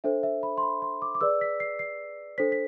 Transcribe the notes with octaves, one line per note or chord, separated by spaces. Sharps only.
D4 A4 C5 E5
E5
B5
C6
B5
C6
D6
D6
G#4 B4 D5 E6
B6
C7
C7
D4 A4 C5 B6
B6